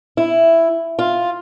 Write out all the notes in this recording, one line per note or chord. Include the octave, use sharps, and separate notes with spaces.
E4
F4